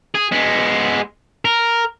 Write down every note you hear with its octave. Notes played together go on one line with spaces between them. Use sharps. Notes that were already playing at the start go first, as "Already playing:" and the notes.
G#4
G#3 B3
A#4